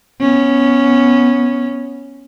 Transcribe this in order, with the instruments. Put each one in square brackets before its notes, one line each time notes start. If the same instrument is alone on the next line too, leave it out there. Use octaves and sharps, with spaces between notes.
[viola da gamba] B3 C#4